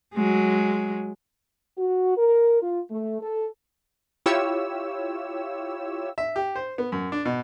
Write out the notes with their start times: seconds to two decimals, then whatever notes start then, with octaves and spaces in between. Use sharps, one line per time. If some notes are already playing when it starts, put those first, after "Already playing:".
0.14 F#3 G#3
1.77 F#4
2.17 A#4
2.62 F4
2.91 A3
3.22 A4
4.26 E4 F4 G4 C#5 E6
6.18 E5
6.36 G4
6.56 C5
6.78 B3
6.92 F#2
7.12 D4
7.25 B2